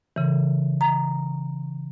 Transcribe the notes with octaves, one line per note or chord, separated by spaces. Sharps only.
C#3 E3
A#5